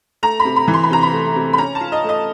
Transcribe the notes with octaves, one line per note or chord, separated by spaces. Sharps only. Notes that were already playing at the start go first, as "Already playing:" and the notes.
A3 A#5
B5
C3
B5
E3
C6
B5
C3 A#5
B5
A3
C3
B5
C#4 A#5
A5
F4
D#5
A3
D#5